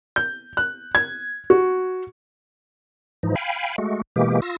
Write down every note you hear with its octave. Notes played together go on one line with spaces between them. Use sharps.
G6
F#6
G#6
F#4
G#2 E3 F3 D#4
F5 G5 G#5 B5
G#3 A3 F#4
B2 E3 G#3 A#3 G4
F4 E6 A#6